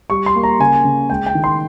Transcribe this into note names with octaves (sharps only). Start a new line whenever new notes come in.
G3 C#6
C6
A#3
A#5
C#3 G#5
C#3
G#3 G5
G5
D#3
C6